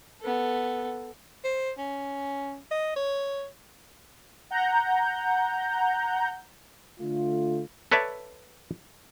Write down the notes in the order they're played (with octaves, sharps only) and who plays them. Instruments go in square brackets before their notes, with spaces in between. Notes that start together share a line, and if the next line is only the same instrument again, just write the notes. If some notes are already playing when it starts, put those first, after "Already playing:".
[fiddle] B3 A4
[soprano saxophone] C5
C#4
D#5
C#5
[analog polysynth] F#5 A#5 G6
[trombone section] D3 A3 F4
[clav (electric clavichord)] A4 B4 C#5 D5 E5 A5